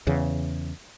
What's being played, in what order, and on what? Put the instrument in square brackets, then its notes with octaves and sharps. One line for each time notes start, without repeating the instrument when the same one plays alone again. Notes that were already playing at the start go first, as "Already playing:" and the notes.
[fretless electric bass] E2 C#3